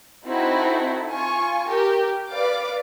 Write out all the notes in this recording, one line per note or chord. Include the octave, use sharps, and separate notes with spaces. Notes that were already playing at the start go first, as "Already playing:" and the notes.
C4 D#4 E4 F#4 A4
F4 G#5 C#6
G4 A#4
B4 D5 F5 D6